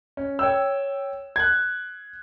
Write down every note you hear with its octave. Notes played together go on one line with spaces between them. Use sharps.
C#4
C#5 G5 E6
F#6 G#6